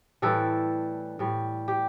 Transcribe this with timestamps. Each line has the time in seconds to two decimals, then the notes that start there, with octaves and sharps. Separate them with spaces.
0.22 A2 E3 G3 A4
1.19 A2 G3
1.68 G4